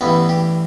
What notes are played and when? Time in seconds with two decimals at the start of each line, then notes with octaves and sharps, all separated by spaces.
0.01 A1 G2 E3 B3
0.29 G4